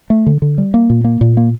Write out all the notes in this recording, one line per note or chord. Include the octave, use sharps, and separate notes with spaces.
A3
D3
D3
G3
A#3
A#2
A#3
A#2
A#3